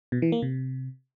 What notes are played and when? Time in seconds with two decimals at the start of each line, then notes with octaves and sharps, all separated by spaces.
0.12 B2
0.22 E3
0.32 A#3
0.42 C3